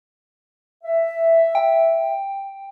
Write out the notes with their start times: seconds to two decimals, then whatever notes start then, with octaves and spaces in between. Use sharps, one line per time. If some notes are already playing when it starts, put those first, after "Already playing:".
0.84 E5
1.55 G5